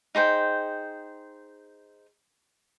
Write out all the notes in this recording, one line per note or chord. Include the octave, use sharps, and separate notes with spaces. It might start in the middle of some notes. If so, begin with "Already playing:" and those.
D#4 G#4 C5 G5